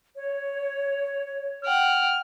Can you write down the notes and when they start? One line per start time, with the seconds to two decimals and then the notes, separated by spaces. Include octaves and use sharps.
0.16 C#5
1.65 F#5 G5 F6